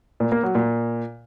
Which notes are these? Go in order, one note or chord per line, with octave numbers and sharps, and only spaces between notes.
A#2
A#3
F#3
A#2